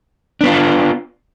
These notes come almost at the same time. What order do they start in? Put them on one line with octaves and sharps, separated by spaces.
D4 B3 F4